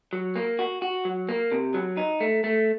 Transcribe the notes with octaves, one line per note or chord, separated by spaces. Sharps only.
F#3
A#3
F#4
F#4
F#3
A#3
C3
F#3
D#4
A3
A3